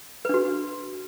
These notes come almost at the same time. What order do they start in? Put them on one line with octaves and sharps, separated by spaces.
B4 D4 F#4